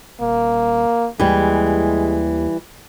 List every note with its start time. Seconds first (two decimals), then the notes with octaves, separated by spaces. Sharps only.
0.21 D#1 A#3
1.20 D#2 E3 G3 G#3